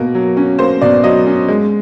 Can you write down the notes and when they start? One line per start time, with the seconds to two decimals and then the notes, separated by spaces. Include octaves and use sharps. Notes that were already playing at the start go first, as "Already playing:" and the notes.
Already playing: B2 A#3 A#4
0.15 F#3
0.37 C#4
0.59 A#3 C5
0.82 B2 D5
1.04 F#3 D#5
1.26 C#4
1.48 G#3